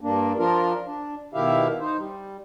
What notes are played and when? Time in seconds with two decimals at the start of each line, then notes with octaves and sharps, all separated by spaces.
0.01 G2 A#3 D4
0.38 F3 D4 F4 A#4
0.86 D4
1.34 B2 D#3 E4 G4 E5 F5
1.80 D#4 C5
1.97 G3